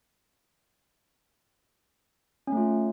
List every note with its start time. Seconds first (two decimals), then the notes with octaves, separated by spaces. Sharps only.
2.47 C#4
2.52 A3
2.57 F4